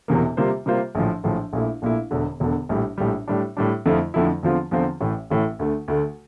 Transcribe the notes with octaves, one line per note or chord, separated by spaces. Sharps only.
E1 E2 C3 E3 A#3
C3 G3 A#3 F4 C5
C3 G3 A#3 F4 C5
A#1 A2 F3
A#1 A2 F3
A#1 A#2 A3 E4
A#1 A#2 A3 E4
E1 E2 D3
E1 E2 D3
A#1 A2 G3
A#1 A2 G3
A2 G3 D4
A2 G3 D4
F2 D3 F3 A3 E4
F2 D3 F3 A3 E4
E2 D3 F3 C4 F4
E2 D3 F3 C4 F4
A1 A2 E3 A3
A1 A2 E3 A3
D2 D3 A3
D2 D3 A3